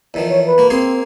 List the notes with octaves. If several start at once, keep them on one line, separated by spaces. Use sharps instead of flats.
E2 D#3 F3
C#5
B4
A#3 F#4
A#3 C4 G#4 C6